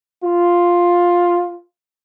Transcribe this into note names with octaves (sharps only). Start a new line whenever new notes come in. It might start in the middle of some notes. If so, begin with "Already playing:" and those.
F4